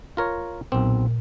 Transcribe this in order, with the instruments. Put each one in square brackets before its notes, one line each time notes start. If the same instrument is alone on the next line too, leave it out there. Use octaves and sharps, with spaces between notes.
[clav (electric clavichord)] F4 A#4 C#5
[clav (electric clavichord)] B1 C4 [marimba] A#2